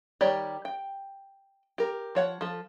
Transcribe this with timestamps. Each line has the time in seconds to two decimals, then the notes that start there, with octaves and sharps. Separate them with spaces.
0.21 D#3 G3 G4 C#5 D5
0.65 G5
1.78 G4 A#4
2.15 F3 C#5 F#5
2.41 F3 A4